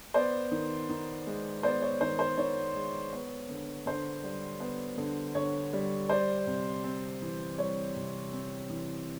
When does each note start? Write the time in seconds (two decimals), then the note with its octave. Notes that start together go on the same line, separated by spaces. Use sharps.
0.14 B3 C5 D5
0.52 D#3
0.89 D#3
1.27 G#3
1.63 B3 C5 D5
1.82 C#5
2.01 D#3 C5
2.19 C5
2.38 D#3 C#5
2.75 G#3
3.13 B3
3.49 D3
3.86 D3 C5
4.24 G3
4.60 B3
4.98 D3
5.35 D3 C#5
5.73 G3
6.09 G3 C5 D5
6.47 C3
6.84 C4
7.22 E3
7.58 G3 C#5
7.96 C3
8.33 C4
8.70 E3